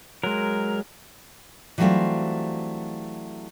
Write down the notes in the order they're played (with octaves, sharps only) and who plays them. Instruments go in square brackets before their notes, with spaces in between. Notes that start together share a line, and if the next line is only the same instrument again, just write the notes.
[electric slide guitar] F#3 G#3 [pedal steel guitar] A#4
[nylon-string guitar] E3 F#3 G3 A3 C4 F4